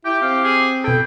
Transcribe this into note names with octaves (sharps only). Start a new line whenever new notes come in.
E4 G4 G5
C4 F5
G#4
B2 E4 A4 G5